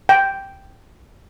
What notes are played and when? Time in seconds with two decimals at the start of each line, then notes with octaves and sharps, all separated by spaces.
0.09 G5